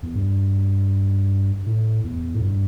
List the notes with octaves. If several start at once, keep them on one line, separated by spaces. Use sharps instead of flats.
E2
G2
A2
E2
A2
G2